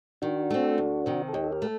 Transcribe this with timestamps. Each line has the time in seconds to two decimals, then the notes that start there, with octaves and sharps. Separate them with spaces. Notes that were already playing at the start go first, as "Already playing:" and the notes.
0.22 D#3 D4 F#4
0.50 A3 C4
0.78 D2
1.06 C3 D#3
1.28 A4
1.33 D#2 D#4 G4
1.44 A4
1.52 G4 A#4
1.62 A3